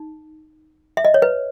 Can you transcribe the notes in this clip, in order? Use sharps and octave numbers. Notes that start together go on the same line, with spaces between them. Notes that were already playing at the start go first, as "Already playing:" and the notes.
Already playing: D#4
E5
D#5
C#5
B4